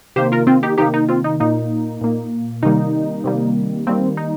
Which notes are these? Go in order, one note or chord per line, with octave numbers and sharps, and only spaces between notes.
C3 D#3 A#3 G4 C5
F4 A#4
C4 F4
D#4 G4
C3 D#3 A#3 D#4 G4
D#4
C4 F4
D#4
A#2 A#3 D#4
A#2 A#3
C3 D#3 G3 A#3 D#4
C3 D#3 G3 A#3
D#3 G3 A#3 C4
D#4